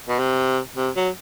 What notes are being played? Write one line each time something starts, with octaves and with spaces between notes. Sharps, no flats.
B2
C3
C3
F#3